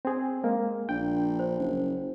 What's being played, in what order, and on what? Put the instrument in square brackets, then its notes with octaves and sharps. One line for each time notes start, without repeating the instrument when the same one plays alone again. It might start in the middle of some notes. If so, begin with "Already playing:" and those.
[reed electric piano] C4 G#4
G#3 A#3
[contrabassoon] A#1 [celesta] D4 [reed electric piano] G5
[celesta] C5
[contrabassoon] F#1